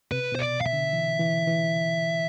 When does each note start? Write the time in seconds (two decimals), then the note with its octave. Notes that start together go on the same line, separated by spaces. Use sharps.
0.12 C3 B4
0.32 B2
0.35 C5
0.39 D5
0.61 F5
0.66 E5
0.73 D3
0.93 E3
1.20 E3
1.47 E3